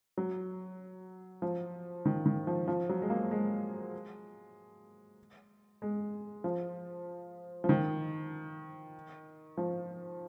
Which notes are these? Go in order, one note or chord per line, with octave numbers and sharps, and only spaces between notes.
F#3
F3
D#3
D#3
F3
F3
F#3
G#3
A#3
G#3
G#3
F3
F3
D#3
F3